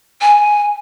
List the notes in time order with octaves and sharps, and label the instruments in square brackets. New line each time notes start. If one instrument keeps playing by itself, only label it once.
[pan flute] G#5